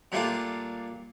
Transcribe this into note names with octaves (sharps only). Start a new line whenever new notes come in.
A#2 G3 A3 A#3 D4 F4